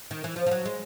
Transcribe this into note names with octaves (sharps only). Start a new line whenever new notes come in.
D#3
E3
F3
F3
F#3
G#3